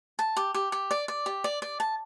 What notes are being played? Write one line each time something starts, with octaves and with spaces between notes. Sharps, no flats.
A5
G4
G4
G4
D5
D5
G4
D5
D5
A5